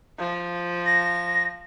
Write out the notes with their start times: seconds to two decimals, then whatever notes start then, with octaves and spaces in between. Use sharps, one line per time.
0.19 F3
0.86 A#6